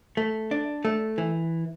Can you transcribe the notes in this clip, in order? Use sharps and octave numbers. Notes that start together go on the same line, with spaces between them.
A3
D4
A3
E3